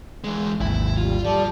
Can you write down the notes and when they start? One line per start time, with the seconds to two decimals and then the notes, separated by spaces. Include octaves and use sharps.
0.24 E3 G#3
0.61 G#1 D#2 E4
0.97 G3 F4
1.24 F3 G3 A4 D5